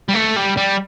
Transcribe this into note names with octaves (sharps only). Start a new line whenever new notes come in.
G3
A3
G3
G3